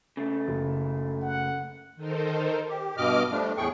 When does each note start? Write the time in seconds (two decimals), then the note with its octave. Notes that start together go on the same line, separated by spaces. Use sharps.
0.17 C#3 A3
0.48 F#1
1.22 F#5
1.96 D#3 D#4 A4 A#4 C5
2.69 G4
2.97 G2 B2 D#5 D6 F6
3.31 F3 G3 A3 D4
3.57 E2 A2 G#4 G5 C#6